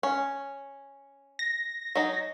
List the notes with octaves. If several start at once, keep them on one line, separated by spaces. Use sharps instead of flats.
C#4
A#6
F#3 D#4